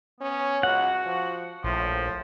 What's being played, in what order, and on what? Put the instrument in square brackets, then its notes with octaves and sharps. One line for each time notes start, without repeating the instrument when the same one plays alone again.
[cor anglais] B3 [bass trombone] C#4
[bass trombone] C#2 [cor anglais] F#4 [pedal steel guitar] F#5
[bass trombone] F3
[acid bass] A#1 [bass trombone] A2 [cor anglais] F3